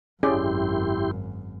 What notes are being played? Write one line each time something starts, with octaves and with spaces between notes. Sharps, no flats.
G#1 F#2 C#4 E4 G4 G#4 D5 C6